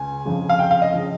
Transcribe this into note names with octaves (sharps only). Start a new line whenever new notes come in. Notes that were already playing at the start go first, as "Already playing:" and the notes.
Already playing: C#2 G#5
F2 C#3 F3
F5
G5
F5
D#5
C#3 F3